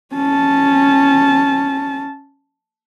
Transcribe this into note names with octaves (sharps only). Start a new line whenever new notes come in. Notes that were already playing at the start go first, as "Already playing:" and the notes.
C#4 A5